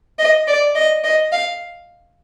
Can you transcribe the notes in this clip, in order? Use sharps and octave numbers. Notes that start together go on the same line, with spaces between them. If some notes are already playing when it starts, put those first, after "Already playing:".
D#5
D5
D#5
D#5
F5